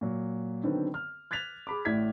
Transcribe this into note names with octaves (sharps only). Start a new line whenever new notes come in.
A#2 F#3
D3 D#3 F#3 B3 C4
F6
F#6 G#6 A6 B6 F7
G#4 B5 D6
A1 A2 E4 D5 G#6 B6